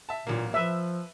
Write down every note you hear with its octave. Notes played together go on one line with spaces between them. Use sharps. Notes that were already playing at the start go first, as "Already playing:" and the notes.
E5 A5
A1 A#2 F#3 A#3
F3 B4 E5 E6